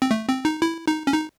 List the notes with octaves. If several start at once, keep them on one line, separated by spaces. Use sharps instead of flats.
C4
A3
C4
D#4
E4
D#4
C#4
D#4